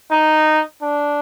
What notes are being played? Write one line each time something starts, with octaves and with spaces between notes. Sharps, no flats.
D#4
D4